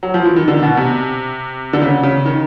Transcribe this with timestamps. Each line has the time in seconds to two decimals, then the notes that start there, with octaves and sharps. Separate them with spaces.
0.03 F#3
0.14 F3
0.25 E3
0.36 D#3
0.48 D3
0.63 B2
0.77 C3
1.73 D3
1.82 C#3
2.03 C#3
2.26 D#3